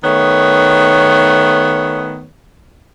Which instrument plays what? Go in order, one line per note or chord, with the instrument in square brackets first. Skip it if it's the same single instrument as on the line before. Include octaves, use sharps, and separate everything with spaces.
[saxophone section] D#3 A3 B3 C#5